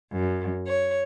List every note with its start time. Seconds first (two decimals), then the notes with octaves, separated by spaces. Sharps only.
0.13 F#2
0.67 C#5